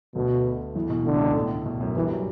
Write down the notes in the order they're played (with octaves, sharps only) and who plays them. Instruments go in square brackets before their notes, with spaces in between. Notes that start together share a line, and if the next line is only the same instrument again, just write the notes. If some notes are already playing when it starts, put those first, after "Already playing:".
[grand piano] D2 D3 [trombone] B2
[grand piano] E2 E3
B2
[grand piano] A2 [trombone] D3
[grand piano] C#2 C#3
C#2 C#3
A2
B2
F#2 F#3
[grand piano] G2 G3 [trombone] E3
[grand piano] F#3